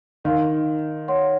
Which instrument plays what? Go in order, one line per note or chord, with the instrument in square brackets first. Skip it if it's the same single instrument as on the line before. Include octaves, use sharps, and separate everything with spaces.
[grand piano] D#3 [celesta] A#4 F5 C6
[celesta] C#5 F#5 C6